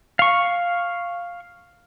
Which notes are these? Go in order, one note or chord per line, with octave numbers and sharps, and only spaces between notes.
F5 C#6